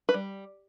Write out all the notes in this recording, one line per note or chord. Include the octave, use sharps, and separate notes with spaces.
B4
G3